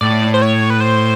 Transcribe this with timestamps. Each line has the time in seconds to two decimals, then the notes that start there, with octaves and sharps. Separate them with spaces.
0.01 A2 D5
0.34 C5
0.42 C#5
0.70 B4
0.81 C5